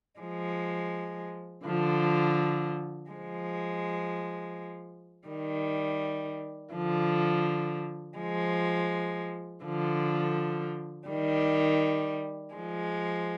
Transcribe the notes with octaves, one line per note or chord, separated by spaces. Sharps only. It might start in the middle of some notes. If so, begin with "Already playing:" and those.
F3 G#3
D3 F3
F3 G#3
D#3 G3
D3 F3
F3 G#3
D3 F3
D#3 G3
F3 G#3